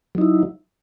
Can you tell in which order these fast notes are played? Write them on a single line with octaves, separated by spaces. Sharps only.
F#3 D#4 E4